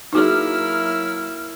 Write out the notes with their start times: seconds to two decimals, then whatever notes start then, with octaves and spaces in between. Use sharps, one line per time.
0.13 F#3 A#3 D#4 E4 F#4 G#4 F6